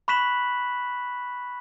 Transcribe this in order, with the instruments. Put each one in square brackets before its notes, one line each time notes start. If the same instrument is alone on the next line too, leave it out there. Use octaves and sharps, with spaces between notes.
[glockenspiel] B5 C#6 F#6 B6 E7 F#7